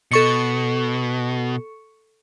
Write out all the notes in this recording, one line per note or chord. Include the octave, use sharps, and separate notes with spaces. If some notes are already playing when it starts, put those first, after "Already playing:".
B2 A4 C#6 C#7